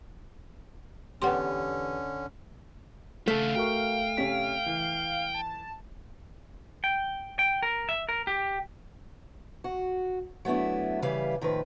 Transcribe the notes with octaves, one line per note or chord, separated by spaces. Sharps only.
E2 D3 B3 C#4 G4 B4 F#5 C6
C#3 A3 A4 F5
F#4 A#4 G5 C#6
C3 C#4 B6
E3
A5
G5
G5
A#4
E5
A#4
G4
F#4
F#3 A3 B3 D4 E4
C#3 E3 G3 B4 F5
A2 D#3 F3 B4